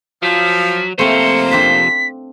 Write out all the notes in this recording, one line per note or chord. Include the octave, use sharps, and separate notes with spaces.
F3 F#3 B6
C3 F3 A3 A#3 C4 C5 C#7
C4 D4 F4 B6